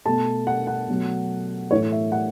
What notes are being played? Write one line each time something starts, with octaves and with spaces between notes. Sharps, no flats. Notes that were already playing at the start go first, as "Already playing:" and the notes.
B2 A3 A5
F#5
F#5
B2 F#3 A3
A2 E3 A3 C#5
E5
F#5